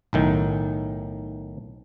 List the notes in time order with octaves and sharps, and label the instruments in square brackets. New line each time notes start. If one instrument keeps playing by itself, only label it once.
[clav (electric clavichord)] B1 A2 D#3